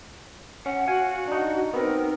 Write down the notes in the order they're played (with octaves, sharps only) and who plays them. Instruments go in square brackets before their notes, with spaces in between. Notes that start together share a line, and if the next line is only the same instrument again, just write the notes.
[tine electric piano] C#4 [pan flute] F#5
[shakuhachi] F#4 [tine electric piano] F5 G#5
[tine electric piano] D4 D#4
[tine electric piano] B3 C4 [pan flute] D#4 [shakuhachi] A#4